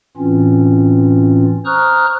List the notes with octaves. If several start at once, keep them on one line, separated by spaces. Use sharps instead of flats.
A2 E3 C4 C#4 F4
C5 A#5 C#6 D#6 F6 F#6